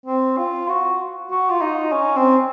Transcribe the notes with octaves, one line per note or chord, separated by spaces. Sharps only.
C4
F4
F#4
F#4
F4
D#4
C#4
C4